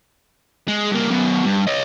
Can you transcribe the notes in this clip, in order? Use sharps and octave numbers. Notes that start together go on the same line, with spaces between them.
G#3
G2 A#3
F#2 B2
G2
C#5 D#5